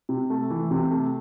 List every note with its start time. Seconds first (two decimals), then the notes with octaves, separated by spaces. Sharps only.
0.09 C3
0.30 A3
0.50 E3
0.71 C3
0.91 A3